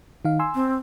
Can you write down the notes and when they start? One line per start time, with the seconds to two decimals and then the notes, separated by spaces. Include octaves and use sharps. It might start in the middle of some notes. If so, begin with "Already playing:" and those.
0.25 D#3 D#4 F5
0.39 G#5 C6 E6
0.55 C4